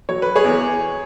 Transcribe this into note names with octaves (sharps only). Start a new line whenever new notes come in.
F#3 C#5
B4
G#4 C#5
E2